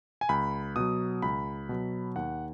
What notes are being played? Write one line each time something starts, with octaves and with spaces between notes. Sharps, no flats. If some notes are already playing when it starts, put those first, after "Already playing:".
G#5
C#2 B5
B2 F#3 D#6
C#2 B5
B2 F#3
D#2 F#5